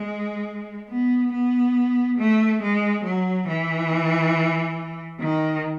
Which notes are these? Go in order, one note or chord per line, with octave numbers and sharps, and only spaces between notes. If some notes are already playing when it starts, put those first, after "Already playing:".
Already playing: G#3
B3
B3
A3
G#3
F#3
E3
D#3